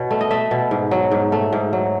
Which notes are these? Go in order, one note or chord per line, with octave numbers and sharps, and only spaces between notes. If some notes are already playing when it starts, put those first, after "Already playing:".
Already playing: B2 C#5
A3
D#5
A3 E5
B2
G#2
F#3
G#2
A3
G#2
F#3